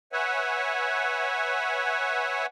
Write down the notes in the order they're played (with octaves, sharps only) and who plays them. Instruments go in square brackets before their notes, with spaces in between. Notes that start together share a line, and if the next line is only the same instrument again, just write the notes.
[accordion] B4 C#5 E5 F#5 G#5